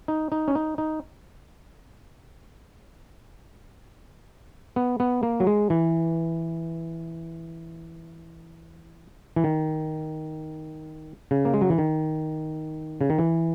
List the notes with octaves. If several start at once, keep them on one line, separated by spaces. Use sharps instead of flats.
D#4
D#4
C#4
D#4
D#4
B3
B3
A#3
F#3
G#3
E3
E3
D#3
C#3
A#3
G#3
F#3
E3
D#3
C#3
D#3
E3